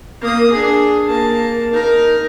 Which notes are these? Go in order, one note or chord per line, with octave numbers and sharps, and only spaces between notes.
A#3 D#6
D4 G#4
A#3 A5
D#4 A#4